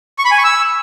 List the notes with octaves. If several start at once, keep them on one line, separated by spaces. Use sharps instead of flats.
C#6
B5
G#5
C#6
E6